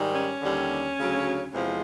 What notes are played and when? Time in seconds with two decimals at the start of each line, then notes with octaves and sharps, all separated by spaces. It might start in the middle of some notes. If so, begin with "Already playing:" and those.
Already playing: G#2 D#3 G3
0.15 C#4
0.42 D#2 D3 G3
0.98 D2 C#3 F#3
1.54 E2 C3 F3 G#3